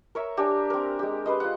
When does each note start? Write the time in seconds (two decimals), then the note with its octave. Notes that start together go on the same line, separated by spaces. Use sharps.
0.15 A#4 C#5 E5
0.37 D4 G4 G#5 A#5
0.70 C4 A#4
0.99 G#3 G4
1.26 B4 C5 D#5
1.40 F4 F#5